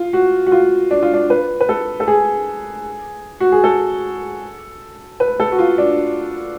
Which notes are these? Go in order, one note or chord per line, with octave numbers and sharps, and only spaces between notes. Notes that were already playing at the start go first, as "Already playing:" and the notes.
Already playing: F4
F#4
F#4
F4
D4
F4
D4
B4
B4
A4
A4
G#4
F#4
G#4
A4
B4
A4
F#4
F4
D4